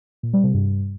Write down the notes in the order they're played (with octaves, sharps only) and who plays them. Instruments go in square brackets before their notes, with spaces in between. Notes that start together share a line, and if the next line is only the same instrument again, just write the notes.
[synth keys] A#2
G3
C3
G2